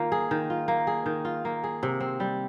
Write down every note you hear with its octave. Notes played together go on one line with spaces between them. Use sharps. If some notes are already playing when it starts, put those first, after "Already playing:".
Already playing: D#3 A#3 F4
G#4
D#3
F4
A#3
G#4
D#3
F4
A#3
G#4
C3
C4
G3